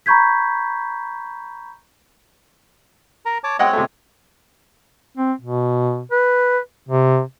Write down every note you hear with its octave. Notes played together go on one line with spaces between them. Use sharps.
A#5 B5 C#6 G6 G#6 B6
A#4 A#5
C#5 A5 D6
G#3 C4 C#5 D#5 F#5 G5
C3 A3
C4
B2
B4
C3